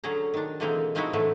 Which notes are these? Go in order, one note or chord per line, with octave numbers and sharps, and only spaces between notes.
D3 F#3 C#4 G#4 A#5
D#3 D4
B2 D3 E3 G#3 A#3 C4
F3 G#3 C4 D#4 E4 F#4
A2 D3 E3 F#3 A3